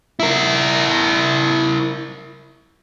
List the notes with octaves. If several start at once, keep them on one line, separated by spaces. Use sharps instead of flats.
E4 A#4